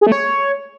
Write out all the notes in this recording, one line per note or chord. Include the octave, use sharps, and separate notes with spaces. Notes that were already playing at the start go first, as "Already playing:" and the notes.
G#4
A3
C#5